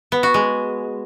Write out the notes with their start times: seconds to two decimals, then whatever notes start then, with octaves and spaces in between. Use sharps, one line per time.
0.12 B3
0.23 F#4
0.34 G#3